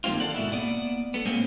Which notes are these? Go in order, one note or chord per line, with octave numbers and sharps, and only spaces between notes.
G2 D#3 G3 A#3 C4 F4
A4 D5 F#5
G#2 B2 E4
A#3 B3 D5 F#5
B3 A4
A#2 G#3 A#3 C4 C#4